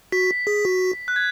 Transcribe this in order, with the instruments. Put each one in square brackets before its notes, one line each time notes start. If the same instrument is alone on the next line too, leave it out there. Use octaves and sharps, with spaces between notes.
[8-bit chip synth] F#4 [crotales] B6
[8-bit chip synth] G#4
F#4
[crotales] F#6
G#6